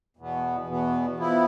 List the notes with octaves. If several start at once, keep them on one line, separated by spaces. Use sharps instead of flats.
E2 B2 B3
E2 B2 B3
F3 B3 E4